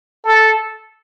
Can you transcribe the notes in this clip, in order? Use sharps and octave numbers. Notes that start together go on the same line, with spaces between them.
A4